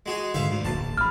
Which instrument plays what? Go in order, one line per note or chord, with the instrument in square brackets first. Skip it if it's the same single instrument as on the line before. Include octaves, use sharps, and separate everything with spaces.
[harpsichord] G#3 F#4 G#4
[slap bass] G#2 D3 D#3 [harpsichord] C5 E5 F5
[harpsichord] D2
[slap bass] D1 A#1 [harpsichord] A5
[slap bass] A1 G#2 [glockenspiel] B5 F6